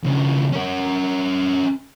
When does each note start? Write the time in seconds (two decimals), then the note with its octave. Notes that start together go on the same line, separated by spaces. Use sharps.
0.04 D#2 C#3
0.53 C#4 A#4